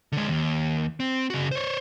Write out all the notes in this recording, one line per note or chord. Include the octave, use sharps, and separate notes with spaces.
D3 G#3
D#2
C4
C#3 F#4
C5 C#5